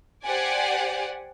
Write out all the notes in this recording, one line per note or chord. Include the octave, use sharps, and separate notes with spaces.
G4 C5 D5 F#5 G#5